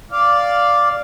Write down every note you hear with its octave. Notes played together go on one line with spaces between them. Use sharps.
D5 F5